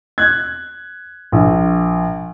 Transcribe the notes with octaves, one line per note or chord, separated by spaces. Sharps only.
F#6 G#6
A#1